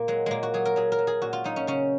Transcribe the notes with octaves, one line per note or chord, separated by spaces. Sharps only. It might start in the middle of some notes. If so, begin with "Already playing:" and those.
Already playing: A#2 A#3
F#3 G#3
A#2 G#3 A#3
F#4
F#3 G#4
A#4
F#3 G#4
A#4
F#3
G#4
A#2 F#4
F4
F#3 D#4
C#4
C#3 C#4